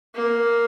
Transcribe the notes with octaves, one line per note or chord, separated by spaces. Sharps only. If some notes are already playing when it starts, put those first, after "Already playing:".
A#3